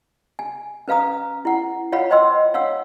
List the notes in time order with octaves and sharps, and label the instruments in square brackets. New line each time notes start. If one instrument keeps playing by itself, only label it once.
[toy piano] G#5
C#4 B4 F5 A#5 D#6
E4 F#5
F4 C#5 F5 F#5 B5
C5 D#5 G5 C6 E6
C#5 F5 F#5 E6